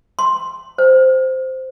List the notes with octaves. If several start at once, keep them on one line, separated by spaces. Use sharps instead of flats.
C6
C5